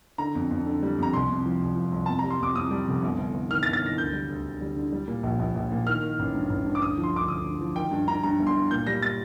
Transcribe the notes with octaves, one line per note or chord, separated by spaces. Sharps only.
D3 A#5
F2
F2
D3
G3
F2 A#5
C2 C6
C3
F3
C2
F3
C2
F2 A5
G3 A#5
C6
F2 D6
F2 D#6
G3
F1
G1
G1
G1
D#3 F6
A6
G1
A6
D#3 A#6
D2 G6
G3
D2
D2
G3
D3
G3
A#2
A#1
A#1
A#1
A#2
D#3 F6
D#3
A1
G2
A1
G2
D6
D2 D#6
F3
C6
D2 D6
D2 D#6
D2
F3
D#3 G5
G2
G2 A#5
G2 A#5
G1
C6
G1
A#2 G6
G3 A#6
A6